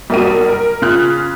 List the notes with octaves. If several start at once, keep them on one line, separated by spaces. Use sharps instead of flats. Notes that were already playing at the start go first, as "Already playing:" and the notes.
B1 G3 A#3 F#4 D#7
A#4
C#3 F4 F6 F#6